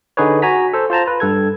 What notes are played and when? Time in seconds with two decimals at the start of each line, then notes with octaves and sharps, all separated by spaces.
0.17 D3 D#4 G#4 B4 C#5
0.42 F#4 G#5 A#5 B6
0.73 A4 C5
0.90 F4 C5 A5 A#5
1.08 B4
1.20 G2 A4 G#6